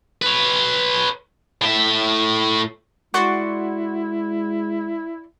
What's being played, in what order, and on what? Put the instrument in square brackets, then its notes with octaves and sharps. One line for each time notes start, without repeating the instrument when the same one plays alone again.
[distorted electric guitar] B4 C#5
A2 E5
[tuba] G#3 [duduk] E4 [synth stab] F#4 [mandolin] D5 C6 C#6